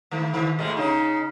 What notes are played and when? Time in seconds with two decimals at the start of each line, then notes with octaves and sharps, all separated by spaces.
0.11 D#3 A3
0.34 D#3
0.59 A2 G#3 A3
0.77 C#3 D#4 G#4